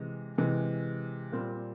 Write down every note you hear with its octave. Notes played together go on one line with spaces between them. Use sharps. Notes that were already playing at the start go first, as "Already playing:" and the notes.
Already playing: C3 E3 G#3
C3 E3 G#3
A#2 G3 C4